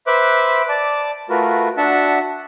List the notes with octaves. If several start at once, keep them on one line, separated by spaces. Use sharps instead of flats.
B4 C5 E5 D6 F#6
D5 A5 D6
A3 F4 F#4 A#4 B4
D4 F#4 E5 F#5 A5